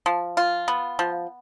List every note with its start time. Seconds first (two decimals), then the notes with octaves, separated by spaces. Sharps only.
0.06 F3
0.37 F4
0.68 B3
0.99 F3